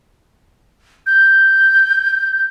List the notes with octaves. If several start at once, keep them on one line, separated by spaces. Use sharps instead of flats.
G6